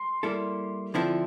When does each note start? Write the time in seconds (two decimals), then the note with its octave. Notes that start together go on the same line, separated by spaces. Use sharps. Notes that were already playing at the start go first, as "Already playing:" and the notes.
Already playing: C6
0.23 G3 A#3 E4 A4
0.94 D3 F3 C4 E4 A4